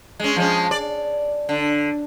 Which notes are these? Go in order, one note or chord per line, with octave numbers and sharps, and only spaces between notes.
G#3 C#4
F3 G#3 C#4
D5
D3